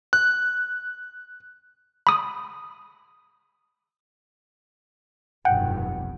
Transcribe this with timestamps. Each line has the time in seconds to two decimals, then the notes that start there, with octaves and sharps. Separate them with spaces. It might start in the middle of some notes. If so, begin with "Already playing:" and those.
0.13 F#6
2.07 B5 D#6
5.45 F1 B1 G2 F#5 G5